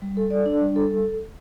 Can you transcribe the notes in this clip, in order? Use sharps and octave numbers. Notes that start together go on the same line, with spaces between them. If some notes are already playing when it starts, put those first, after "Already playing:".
G3
A4
D5
D4
G3
A4